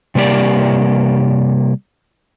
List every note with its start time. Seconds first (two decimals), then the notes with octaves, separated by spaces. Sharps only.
0.15 C3 G3 A#3 G4 D5